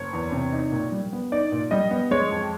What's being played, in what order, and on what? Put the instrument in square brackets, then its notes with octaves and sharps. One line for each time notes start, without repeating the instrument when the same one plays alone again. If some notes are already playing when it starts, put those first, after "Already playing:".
Already playing: [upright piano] F#1 C#5
E2
C3
D#4
A#2
G3
B3
D#4 D5
A#2
G3 D#5
B3
G#3 C#5
F2